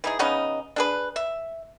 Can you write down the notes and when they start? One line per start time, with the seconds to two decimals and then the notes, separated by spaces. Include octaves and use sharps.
0.04 E3 D#4 G#4
0.19 C#3 B3 C#4 D#4
0.76 D4 G#4 B4
1.16 E5